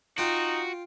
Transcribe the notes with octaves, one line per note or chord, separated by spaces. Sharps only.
D#4 F4 F#4 G5